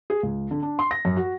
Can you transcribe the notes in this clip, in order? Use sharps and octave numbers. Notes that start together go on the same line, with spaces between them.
G#4
C#2
D3
D4
C6
A#6
F#2
F#4